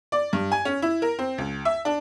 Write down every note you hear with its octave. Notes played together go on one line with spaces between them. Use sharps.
D5
G2
G#5
C#4
E4
A#4
C4
C#2
E5
D4